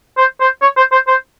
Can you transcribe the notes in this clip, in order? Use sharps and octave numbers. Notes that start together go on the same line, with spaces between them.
C5
C5
C#5
C5
C5
C5